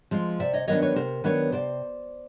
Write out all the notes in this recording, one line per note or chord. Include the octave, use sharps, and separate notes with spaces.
F3 G#3 C4
C3 D5 E5
C#5 D#5
D#3 F#3 B3 D4 C#5 D#5
B4 C#5
C3 A#4 C5
D#3 F#3 B3 D4 B4 C#5
C3 C5 D5